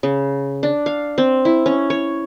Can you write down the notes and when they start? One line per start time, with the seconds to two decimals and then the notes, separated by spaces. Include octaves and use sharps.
0.03 C#3
0.63 D4
0.86 F5
1.18 C4
1.45 E4
1.66 C#4
1.90 C#5